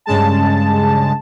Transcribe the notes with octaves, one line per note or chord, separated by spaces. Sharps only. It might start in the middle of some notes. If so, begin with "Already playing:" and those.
G2 C#3 G#3 A5